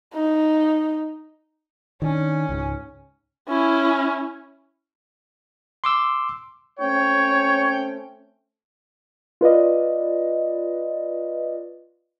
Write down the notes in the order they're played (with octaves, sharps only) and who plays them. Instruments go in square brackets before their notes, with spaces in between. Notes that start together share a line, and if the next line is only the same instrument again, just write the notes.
[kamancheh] D#4
[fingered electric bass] D#3 D4 [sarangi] C#4
[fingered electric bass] C#2 G#2
[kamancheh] C#4 E4
[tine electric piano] C6 D6 E6
[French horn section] A3 C4 C#4 [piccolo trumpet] C#5 [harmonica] G5
[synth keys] F4 B4 D5 D#5